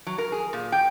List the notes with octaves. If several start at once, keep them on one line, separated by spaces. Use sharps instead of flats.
F#3
A#4
G#4
A#2
G5